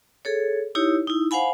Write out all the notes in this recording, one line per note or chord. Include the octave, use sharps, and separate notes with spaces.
G#4 A4 C#5
D#4 E4 G4 C#5
D#4 E4
C5 F5 F#5 G#5 B5